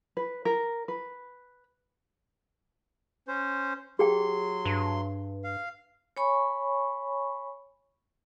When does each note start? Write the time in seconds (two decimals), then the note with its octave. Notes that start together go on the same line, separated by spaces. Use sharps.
0.17 B4
0.45 A#4
0.88 B4
3.28 C#4 C5
3.99 F#3 G4 G#4 G5 C6
4.65 G2
5.44 F5
6.17 C#5 G#5 B5 C#6